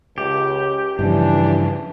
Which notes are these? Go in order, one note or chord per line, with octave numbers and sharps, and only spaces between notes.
C#2 G4
G2 C#3 E3 F3 D4